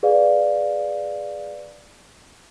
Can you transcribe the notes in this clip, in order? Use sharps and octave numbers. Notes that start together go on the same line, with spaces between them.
G#4 B4 D5 F5